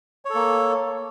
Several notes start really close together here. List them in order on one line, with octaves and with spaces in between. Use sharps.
C#5 A4 A#3